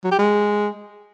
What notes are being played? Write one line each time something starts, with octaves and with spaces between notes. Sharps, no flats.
F#3
G4
G#3